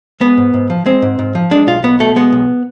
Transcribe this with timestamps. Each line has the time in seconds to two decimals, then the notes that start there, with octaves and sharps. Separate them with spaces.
0.20 G#3 B3
0.37 G#2
0.54 G#2
0.70 F3
0.86 G#3 C4
1.02 G#2
1.19 G#2
1.35 F3
1.51 G#3 D4
1.67 B1 F4
1.83 B1 B3
2.00 B2 A3
2.16 G#3 B3
2.32 B1